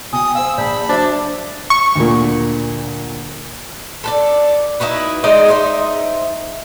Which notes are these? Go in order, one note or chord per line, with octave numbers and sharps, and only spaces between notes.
B2 G5 G#5 D#6
C5 F5 E6
A#1 D5 A5 B5 G6
F#3 D4 C5 E5
C#6
D2 A#2
A4 B4 D5
D#4 E4 F#4 B4
G#3 D#4 D5 D#5
D#4 C5 E5